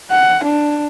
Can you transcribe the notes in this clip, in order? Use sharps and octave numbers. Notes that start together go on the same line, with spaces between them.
F#5
D4